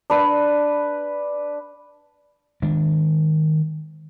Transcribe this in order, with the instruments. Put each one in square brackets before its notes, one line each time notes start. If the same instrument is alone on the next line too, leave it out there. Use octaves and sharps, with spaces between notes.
[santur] D4 B4
[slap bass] D#3 G#3 D4